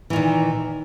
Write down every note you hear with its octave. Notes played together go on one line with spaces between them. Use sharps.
A#2 D#3 E3